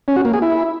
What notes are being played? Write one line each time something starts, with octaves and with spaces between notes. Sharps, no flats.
C#4
F#4
A#3
G#4
E4